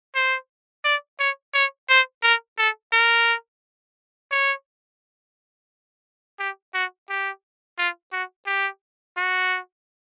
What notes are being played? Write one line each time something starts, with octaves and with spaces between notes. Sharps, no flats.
C5
D5
C#5
C#5
C5
A#4
A4
A#4
C#5
G4
F#4
G4
F4
F#4
G4
F#4